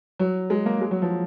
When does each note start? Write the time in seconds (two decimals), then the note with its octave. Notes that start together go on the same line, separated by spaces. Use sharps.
0.19 F#3
0.50 G#3
0.66 A#3
0.81 G#3
0.91 F#3
1.02 F3